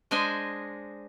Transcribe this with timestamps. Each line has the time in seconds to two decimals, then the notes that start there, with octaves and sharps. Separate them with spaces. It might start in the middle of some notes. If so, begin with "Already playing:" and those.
0.11 G#3 D4 C5 D#5 G#5